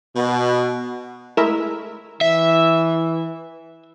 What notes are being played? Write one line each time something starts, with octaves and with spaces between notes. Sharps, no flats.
B2
G#3 A3 E4 A#4 E5
E3 E5